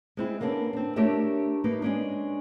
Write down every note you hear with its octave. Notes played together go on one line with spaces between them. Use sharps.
G#3 C4 E4
D3 A#3 B3 C#4 D4
C4 D4
A3 D4 G4 A#4 C#5 E5
A#3 D#4 B4
G#3 C#4 D4